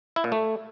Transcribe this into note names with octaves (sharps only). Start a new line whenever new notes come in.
E4
A#2
A3